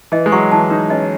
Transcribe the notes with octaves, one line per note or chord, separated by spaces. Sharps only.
E3 D#5
G#3
F#3 C#6
E3 A5
D#4 B4
C#4 D#5